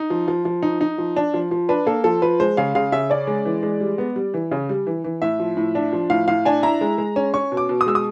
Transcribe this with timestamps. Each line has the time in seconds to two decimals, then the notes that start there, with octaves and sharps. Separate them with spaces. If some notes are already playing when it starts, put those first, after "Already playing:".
Already playing: D#4
0.10 F3
0.28 F3
0.45 F3
0.63 D#4
0.81 D#4
0.98 F3
1.16 D4
1.34 F3
1.51 F3
1.69 D4 B4
1.86 A#3 A4
2.04 F3 A4
2.22 F3 B4
2.40 G#3 C5
2.57 C#3 F5
2.75 C#3 F5
2.92 C#3 E5
3.10 C#4 D5
3.27 G#3
3.45 E3
3.63 G#3
3.80 G3
3.98 B3
4.16 G3
4.34 E3
4.51 C#3
4.69 G3
4.87 E3
5.04 E3
5.22 A2 E5
5.39 F3
5.57 A2
5.75 D4
5.93 F3
6.10 A2 F5
6.27 A2 F5
6.45 D4 G#5
6.63 E4 A#5
6.81 G#3
6.98 G#3
7.16 C#4
7.34 C#4 C#6
7.52 B2
7.57 D6
7.69 B2
7.81 D#6
7.86 G#3 E6
7.95 D#6